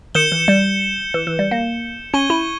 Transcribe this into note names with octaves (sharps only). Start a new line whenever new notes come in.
D#3 G6 C#7 E7 G7
E3
G3
E3
E3
G3
A#3
C#4 C#6 G#6 D#7 G7
E4